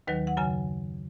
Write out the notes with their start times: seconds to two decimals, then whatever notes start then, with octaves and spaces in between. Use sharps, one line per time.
0.07 D#2 D#3 F#3 B4
0.27 F#5
0.37 F#2 C#3 F#3 G#5